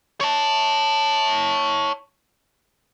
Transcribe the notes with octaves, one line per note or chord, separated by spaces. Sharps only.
C#5 A5